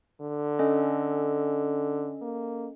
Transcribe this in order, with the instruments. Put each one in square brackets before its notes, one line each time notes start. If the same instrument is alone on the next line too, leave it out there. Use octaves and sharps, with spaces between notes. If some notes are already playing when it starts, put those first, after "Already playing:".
[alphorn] D3
[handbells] C#4 A4 D#5
[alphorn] A#3